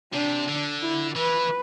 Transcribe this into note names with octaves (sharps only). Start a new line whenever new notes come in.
C3 D4
D3
E4
E3 B4